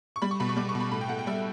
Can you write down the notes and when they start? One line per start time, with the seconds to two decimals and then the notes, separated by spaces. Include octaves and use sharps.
0.16 C#6
0.22 G3 B5
0.31 C#6
0.40 B2 B5
0.49 C#6
0.57 G3 D6
0.69 C#6
0.75 B2
0.80 B5
0.92 A2 B5
1.01 G5
1.09 A2 F#5
1.19 G5
1.27 G3 E5